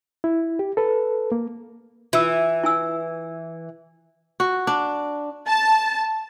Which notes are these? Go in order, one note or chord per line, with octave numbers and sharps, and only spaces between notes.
E4
G4
A4 B4
A#3
E3 F4 E6
E4 G#5 E6
F#4
D4
A5